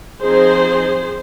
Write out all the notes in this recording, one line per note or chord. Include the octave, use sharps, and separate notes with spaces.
F3 C4 D#4 G#4 C5